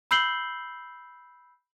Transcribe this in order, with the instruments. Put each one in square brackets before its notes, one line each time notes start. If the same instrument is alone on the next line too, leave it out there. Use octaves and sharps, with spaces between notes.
[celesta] B5 E6 G6 C7 F#7 G7